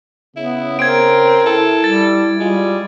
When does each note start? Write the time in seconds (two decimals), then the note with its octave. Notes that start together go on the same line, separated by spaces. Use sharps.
0.36 C#3 B3 E4
0.79 C4 A#4 G#6 D7
1.45 E4 A4
1.84 G3 A6
2.40 G3 G#3 F4